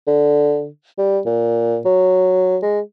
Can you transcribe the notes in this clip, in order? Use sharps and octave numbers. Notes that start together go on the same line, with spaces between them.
D3
G3
A#2
F#3
G#3